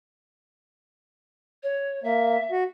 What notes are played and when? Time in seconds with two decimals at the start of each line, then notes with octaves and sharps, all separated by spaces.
1.63 C#5
2.04 A#3 E5
2.52 F#4